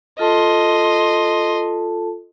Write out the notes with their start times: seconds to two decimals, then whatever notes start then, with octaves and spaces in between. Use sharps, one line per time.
0.19 F4 A4 D#5 A5 C6